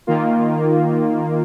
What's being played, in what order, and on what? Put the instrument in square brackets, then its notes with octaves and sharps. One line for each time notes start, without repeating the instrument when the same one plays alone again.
[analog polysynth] D#3 A#3 F4